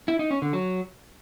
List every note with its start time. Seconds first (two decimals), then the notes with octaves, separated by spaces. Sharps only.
0.08 E4
0.19 D#4
0.31 C#4
0.42 D3
0.53 F#3